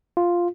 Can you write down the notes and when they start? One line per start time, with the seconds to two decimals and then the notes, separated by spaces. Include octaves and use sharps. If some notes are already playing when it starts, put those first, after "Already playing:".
0.17 F4